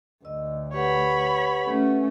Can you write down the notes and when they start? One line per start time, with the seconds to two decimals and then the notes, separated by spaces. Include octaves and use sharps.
0.25 D2 D#5 E6
0.73 G4 B4 C#5 F#5 B5
1.67 A3 C#4